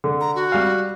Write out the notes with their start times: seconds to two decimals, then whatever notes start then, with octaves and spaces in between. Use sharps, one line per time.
0.04 D3
0.21 A#5
0.35 F#4
0.52 G3 F5